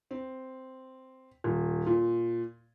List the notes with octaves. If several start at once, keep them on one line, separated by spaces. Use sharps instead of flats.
C4
D#1
A#2